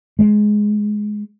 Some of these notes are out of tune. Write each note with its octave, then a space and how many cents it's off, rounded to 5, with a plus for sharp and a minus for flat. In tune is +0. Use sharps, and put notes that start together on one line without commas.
G#3 +10